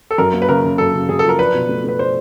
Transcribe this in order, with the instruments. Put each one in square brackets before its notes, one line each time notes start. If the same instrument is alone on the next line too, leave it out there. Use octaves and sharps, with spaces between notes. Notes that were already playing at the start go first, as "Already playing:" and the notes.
[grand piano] A4
[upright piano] F#2 [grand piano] A#4
[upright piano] A#3
[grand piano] B4
[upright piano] C#3 [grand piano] A#4
[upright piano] C#3
[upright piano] F#2 [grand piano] A4
[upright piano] C#3
[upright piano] F#2 [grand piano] G#4
[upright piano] F3 [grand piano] A4
[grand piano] A#4
[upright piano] D4 [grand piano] B4
[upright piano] B2
A3
[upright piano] A3 [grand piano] B4
[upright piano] D4 [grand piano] C5